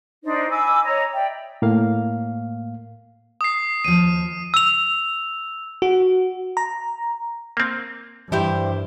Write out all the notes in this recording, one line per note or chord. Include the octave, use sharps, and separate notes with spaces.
D4 D#4 C5 D5
G#5 B5 D6 E6
C#5 D#5 A#5
D5 E5 G5
A2 A#3 F5
D#6 C7
D#2 F3 D#7
E6 F7
F#4
A#5
A#3 C4
G2 E3 E4 G4 C5